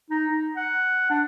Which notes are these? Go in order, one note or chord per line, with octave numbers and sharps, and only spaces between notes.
D#4
D#4
F#5
D4